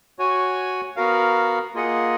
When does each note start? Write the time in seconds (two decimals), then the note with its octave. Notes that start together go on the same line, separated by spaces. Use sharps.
0.19 F#4 C#5 G#5
0.96 B3 F#4 A#4 F5
1.75 A#3 F4 G#4 D#5 F#5